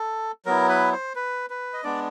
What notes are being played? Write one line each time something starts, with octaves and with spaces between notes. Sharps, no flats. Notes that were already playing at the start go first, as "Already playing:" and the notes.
Already playing: A4
F#3 B3 E4 A#4
B4
C5
B4
B4
D#5
G#3 B3 D4 D5